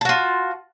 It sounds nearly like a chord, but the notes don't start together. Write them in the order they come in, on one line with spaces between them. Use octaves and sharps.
A5 F#4 F4